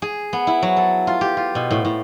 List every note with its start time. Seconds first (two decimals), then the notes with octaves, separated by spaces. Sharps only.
0.02 G#4
0.33 B3
0.47 E4
0.63 F#3
0.77 A4
1.07 F4
1.21 G4
1.37 F4
1.55 B2
1.71 A2
1.85 A2